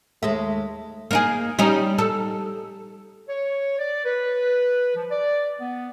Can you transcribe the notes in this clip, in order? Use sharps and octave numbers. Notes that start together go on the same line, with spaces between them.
D#2 G#3 A3 E5
A#3 D#4 G#4
G3 C#4 D#4
A4
C#5
D5
B4
F3
D5
B3